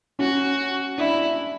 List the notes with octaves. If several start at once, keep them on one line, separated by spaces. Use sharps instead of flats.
C#4 F#4
D4 E4